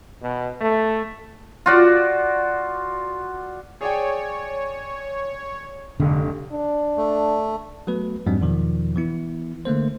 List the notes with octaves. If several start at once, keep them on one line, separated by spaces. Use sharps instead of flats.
B2
A3
F4 F#4 D5
G#4 C#5 D5 G5
F1 G2 D3
D4
A3
F#3 A3 B3 F#4 B4
F2 G#2 F#3 G3 C4 D4
E2 B2 D#3 F3
E3 B3 E4
D3 A3 A#3 C5